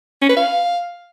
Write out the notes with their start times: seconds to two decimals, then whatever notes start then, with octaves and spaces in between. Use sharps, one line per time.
0.22 C#4
0.29 B4
0.37 F5